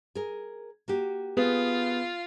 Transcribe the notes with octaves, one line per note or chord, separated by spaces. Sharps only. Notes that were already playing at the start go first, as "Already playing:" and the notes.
G#4 A#4
A#3 F#4 G4
B3 F4 G#4 B4